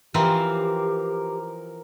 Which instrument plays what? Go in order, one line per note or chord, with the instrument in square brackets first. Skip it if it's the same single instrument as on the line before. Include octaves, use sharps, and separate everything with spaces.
[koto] E3 F3 C4 [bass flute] G4 [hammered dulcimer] A#4